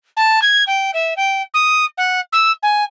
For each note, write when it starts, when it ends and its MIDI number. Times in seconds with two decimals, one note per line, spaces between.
0.17 0.40 81
0.42 0.63 92
0.67 0.91 79
0.94 1.14 76
1.17 1.42 79
1.54 1.85 87
1.98 2.20 78
2.33 2.52 88
2.63 2.84 80